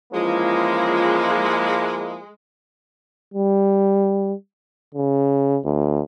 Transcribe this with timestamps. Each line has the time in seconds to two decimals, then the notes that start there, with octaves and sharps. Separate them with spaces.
0.13 E3 F3 G#3 A#3 C#4 E4 F4
3.34 G3
4.94 C#3
5.65 D2